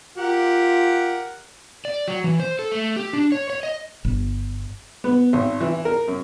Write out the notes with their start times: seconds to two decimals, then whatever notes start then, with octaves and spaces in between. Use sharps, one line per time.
0.17 F4 G4 A#4 F#5
1.85 D5
2.08 F#3
2.24 E3
2.40 C5
2.59 A4
2.72 A3
2.96 G4
3.13 D4
3.32 C#5
3.50 C#5
3.63 D#5
4.05 G1
5.04 B3
5.33 G#1
5.61 E3
5.85 A#4
6.08 F#2